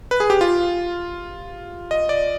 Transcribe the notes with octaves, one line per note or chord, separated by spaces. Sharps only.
B4
G#4
G4
F4
D#5
D5